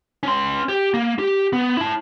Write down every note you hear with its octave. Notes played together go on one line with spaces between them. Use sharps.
C#4 C6
G4
A#3
G4
B3
E4 A5